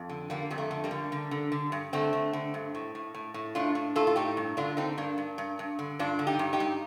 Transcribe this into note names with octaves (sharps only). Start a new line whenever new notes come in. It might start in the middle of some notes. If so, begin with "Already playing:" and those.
Already playing: F2
D3
D3 G3 A#3
F2 G3
A3
D3
G3 A#3
D3
D3
D3
D3
G2
D3 A3 C4
D3
D3
G2
A2
A2
A2
A2
A2 D4 F4
A2
A2 F4 A4
F4
A2 D#4 G4
G2
D3 D4 F4
D3 C4 D#4
G2 A#3 D4
G2
G2
G2
D3
G2 D4 F4
D3
D#4 G4
G2
D#4 G4
G2